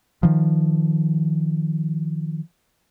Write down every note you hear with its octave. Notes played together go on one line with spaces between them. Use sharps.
D#3 F3